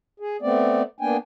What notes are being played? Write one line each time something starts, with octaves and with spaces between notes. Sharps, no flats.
G#4
A3 B3 C4 D5
A#3 B3 D4 G5 G#5